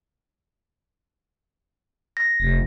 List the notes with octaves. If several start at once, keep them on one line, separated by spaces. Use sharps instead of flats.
A#6
F1